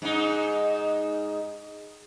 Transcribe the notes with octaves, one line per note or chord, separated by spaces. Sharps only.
G#2 D#4